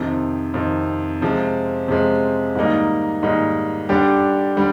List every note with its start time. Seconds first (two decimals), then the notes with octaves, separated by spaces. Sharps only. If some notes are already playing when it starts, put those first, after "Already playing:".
Already playing: F2 C3 D#3
0.54 F2 C3 D#3
1.21 C3 F3 G#3
1.88 C3 F3 G#3
2.55 G#2 D#3 G3 A#3 D#4
3.22 G#2 D#3 G3 A#3 D#4
3.89 D3 G3 D4 G4
4.56 D3 G3